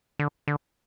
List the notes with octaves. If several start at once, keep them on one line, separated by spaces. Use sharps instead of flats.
D3
D3